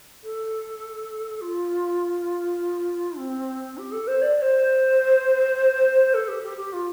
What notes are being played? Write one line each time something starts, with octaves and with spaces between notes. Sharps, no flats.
A4
F4
C4
G4
A4
C5
D5
D5
C5
A4
G4
G4
G4
F4